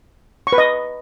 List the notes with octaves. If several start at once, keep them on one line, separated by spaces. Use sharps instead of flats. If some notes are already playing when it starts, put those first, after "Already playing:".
C#6
B4
D#5